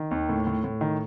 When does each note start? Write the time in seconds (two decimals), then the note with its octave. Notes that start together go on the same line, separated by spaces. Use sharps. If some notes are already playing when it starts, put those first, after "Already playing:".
Already playing: D#3
0.11 D#2
0.29 A2
0.47 A2
0.64 A2
0.81 D#3